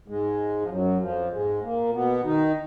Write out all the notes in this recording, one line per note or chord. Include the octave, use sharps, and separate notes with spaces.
G#2 G#3
F3
F#2 F#3
F2 F3
G#2 G#3
A#2 A#3
B2 B3
D#3 D#4